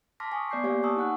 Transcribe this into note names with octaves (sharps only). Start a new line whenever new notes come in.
A5 C6 D6 F6 A#6 B6
G#5 C#6 D#6
B3 D5 D6 G6 C7
A#3 G4 C#5 F5 G#5
G#5 A5 C#6 D#6 E6
D#4 F#5 F#6